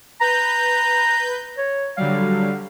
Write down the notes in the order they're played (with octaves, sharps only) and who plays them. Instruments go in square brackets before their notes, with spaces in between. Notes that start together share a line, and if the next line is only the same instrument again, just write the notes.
[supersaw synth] B4 G6 [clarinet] A#5
[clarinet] C#5
[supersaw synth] D3 F#3 G3 [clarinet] F5